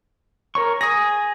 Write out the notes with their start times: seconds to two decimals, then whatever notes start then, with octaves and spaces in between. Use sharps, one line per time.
0.55 A#4 C#5 C#6
0.81 G#4 D#6 A#6